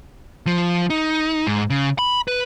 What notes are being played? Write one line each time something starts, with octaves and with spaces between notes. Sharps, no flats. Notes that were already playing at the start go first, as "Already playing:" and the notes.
F3
D#4
G#2
C#3
B5
B4